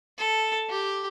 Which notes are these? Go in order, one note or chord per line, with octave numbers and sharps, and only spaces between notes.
A4
G4